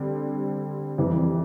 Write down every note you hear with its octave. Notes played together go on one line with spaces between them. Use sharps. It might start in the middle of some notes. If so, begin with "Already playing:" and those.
Already playing: D3 G3 C4
F2 E3 G3